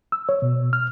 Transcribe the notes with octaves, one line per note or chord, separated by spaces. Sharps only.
E6
C#5
B2
F6